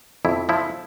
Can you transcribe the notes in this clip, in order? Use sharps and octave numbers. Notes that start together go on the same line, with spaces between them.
F2 E4
F3 E4